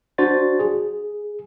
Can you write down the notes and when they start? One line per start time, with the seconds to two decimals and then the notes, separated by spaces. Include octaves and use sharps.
0.18 D4 F#4 C5 D5 A6
0.59 G#4